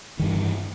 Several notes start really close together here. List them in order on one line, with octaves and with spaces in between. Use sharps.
D#3 G2 E3